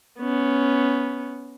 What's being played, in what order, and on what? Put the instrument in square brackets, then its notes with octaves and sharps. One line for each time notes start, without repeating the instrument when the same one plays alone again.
[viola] B3 C#4